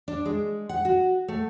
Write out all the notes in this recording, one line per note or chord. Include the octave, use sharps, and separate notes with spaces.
D4
G#3
F#5
F#4
A3